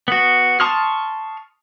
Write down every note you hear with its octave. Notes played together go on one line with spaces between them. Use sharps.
B3 F#4
A5 C6 C#6 D#6 F6